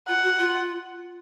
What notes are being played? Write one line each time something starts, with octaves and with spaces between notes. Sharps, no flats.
F4 F#5
F#4
F4